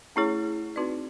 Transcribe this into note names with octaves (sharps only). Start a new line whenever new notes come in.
A3 C#4 E4 G#4 C#5
C4 D#4 F#4 B4 D5